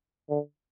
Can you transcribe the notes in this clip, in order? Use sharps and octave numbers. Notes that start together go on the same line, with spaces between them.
D3